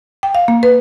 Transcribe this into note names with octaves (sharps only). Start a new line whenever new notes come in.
G5
F5
A#3
B4